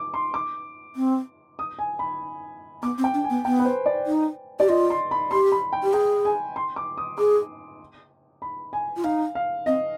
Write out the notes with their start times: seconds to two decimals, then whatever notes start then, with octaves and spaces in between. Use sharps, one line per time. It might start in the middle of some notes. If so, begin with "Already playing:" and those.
Already playing: D6
0.14 C6
0.34 D6
0.96 C4
1.59 D#6
1.79 G#5
1.99 B5
2.82 B3 D6
2.98 C4
3.04 G5
3.14 D4
3.24 G#5
3.30 B3
3.45 B3 G5
3.60 B4
3.65 C5
3.86 D5
4.06 D#4
4.60 G4 D5
4.69 F4 D#5
4.90 C6
5.11 B5
5.31 G4 C6
5.52 B5
5.73 G5
5.83 G4
5.93 G#4 G5
6.25 G#5
6.56 C6
6.76 D6
6.98 D#6
7.18 G#4 D6
8.42 B5
8.73 G#5
8.96 F4
9.04 D#4 F5
9.35 F5
9.66 C4 D#5